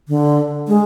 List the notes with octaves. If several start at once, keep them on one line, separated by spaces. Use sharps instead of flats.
D3
G#3